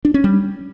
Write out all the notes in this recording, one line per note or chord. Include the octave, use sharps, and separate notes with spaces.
D4
C#4
G3